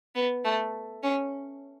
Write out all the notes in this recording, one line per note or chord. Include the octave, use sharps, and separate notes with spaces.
B3
A3
C#4